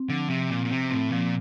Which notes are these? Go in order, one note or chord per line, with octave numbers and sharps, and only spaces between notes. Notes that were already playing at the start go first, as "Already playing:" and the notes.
Already playing: C4
D3 F3
C3 F3
A#2 C4
A#2
C3 C4
A2 C4
A#2 F3